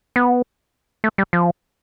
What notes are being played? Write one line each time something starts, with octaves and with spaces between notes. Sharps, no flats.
B3
A3
G3
F3